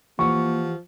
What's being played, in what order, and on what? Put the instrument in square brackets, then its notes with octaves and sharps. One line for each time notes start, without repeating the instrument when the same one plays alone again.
[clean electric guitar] E3 G4 F#5 [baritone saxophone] F3 [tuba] A#3 [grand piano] C#6